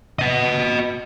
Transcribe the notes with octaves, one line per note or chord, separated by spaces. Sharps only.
B4 D#5